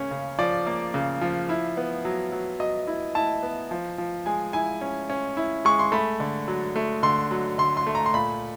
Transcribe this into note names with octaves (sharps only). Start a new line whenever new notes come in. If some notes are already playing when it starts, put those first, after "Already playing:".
Already playing: C#3 A#3 C#4
C#3
F3 D5
A#3
C#3
F3
E4
B3
F#3
F#3
F#3 D#5
E4
E4 A5
B3
F3
F3
G#3 G#5
E4 G#5
C#4
C#4
E4
G#3 C#6
C6
A3 B5
D3
F#3
A3
D3 C6
F#3
D3 C6
C6
A3
A#5
C6
A#2 B5